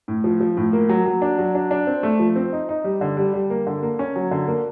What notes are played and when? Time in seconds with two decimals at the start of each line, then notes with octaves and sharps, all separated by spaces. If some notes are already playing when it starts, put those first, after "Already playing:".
0.08 A2
0.24 F3
0.41 F3
0.57 A2
0.73 A#3
0.89 F#3
1.06 F#3
1.22 D4
1.39 F#3
1.55 D4
1.71 D4
1.87 C4
2.03 A3
2.19 F3
2.36 C4
2.52 D#4
2.69 D#4
2.84 G3
3.01 D3
3.17 G3
3.34 G3
3.50 A#3
3.67 D3
3.83 A#3
3.99 C#4
4.16 F#3
4.31 D3
4.47 A#3